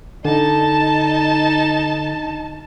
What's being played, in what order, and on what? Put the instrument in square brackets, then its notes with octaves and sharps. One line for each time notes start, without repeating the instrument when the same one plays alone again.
[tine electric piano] D3 [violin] D#4 A5